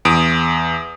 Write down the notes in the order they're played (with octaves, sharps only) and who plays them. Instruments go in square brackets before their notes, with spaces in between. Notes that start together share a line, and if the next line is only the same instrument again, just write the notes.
[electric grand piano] E2 D#6 D7